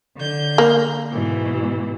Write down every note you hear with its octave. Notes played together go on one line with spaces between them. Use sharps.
D3 G6
A#3
G#2 B2 E3